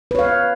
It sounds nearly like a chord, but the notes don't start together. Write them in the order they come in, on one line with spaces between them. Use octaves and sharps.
B4 C#5 F5